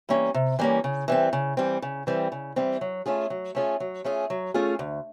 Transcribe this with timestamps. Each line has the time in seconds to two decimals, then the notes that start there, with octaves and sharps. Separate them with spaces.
0.09 E3 G3 A#3 C#4
0.34 C3
0.59 E3 G3 A#3 C#4
0.84 C#3
1.08 E3 G3 C4
1.33 C#3
1.57 E3 G3 C4
1.82 C#3
2.07 E3 G3 C4
2.32 C#3
2.56 E3 G3 C4
2.81 F#3
3.06 A3 C#4 F4 G#4
3.30 F#3
3.55 A3 C#4 F4 G#4
3.80 F#3
4.04 A3 C#4 F4 G#4
4.30 F#3
4.54 A3 C#4 F4 G#4
4.79 D2